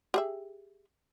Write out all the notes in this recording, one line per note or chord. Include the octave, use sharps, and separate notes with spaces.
G4 G#4 E5